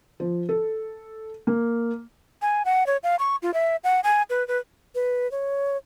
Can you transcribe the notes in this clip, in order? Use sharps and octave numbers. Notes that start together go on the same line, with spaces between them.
F3
A4
A#3
G#5
F#5
C#5
F5
C#6
F4
E5
F#5
G#5
B4
B4
B4
C#5